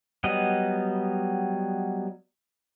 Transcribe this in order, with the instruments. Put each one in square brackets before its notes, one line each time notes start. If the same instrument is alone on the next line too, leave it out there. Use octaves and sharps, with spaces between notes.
[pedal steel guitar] F#3 G3 B3 D#5